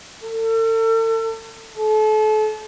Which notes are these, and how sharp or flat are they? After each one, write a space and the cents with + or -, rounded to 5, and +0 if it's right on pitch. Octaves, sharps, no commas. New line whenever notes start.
A4 +40
A4 -35